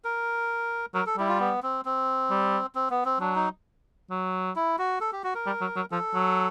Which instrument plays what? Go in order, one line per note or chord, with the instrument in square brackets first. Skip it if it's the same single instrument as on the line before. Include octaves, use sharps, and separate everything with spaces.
[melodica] A#4
[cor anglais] F#3 [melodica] A#4
[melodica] A4
[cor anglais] G3 [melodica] E4
[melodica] F4
B3
C4
C4
[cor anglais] G3
[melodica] C4
B3
C4
[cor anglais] F#3 [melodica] D4
[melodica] D#4
[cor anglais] F#3
[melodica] E4
F#4
A4
G4
F#4
A#4
[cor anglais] G3
F#3
F#3
[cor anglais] F3 [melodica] A4
[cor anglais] F#3